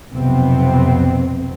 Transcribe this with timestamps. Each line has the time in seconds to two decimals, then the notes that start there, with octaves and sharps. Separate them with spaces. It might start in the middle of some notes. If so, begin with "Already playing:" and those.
0.14 B1 F2 C3 B3 C4